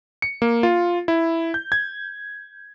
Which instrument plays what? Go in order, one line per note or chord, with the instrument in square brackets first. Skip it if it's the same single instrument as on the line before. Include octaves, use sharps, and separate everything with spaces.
[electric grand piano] C#7
A#3
F4
E4
G6
G#6